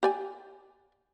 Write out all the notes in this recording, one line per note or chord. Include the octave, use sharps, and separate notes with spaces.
G4 D5 G#5